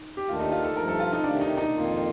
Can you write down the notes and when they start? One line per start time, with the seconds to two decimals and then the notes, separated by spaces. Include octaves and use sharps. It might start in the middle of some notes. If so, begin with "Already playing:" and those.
Already playing: D#4
0.17 G4
0.27 D#2 D#3 A3 D4 F4
0.39 D#4
0.52 F4
0.64 A4
0.76 G2 F3 A3 A#4
0.88 A4
1.00 F4
1.13 D#4
1.24 C3 D#3 A3 D4
1.41 D#4
1.57 D#4
1.73 F2 D#3 A#3 F4